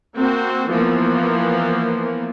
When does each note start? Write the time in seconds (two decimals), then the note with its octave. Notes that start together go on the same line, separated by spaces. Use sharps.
0.16 A#3 C4 F#4
0.69 E3 F3 A#3 B3